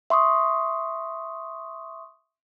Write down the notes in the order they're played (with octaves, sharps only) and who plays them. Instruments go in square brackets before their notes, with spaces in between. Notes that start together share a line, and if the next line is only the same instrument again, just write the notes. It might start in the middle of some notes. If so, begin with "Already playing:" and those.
[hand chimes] E5 C6 C#6 D#6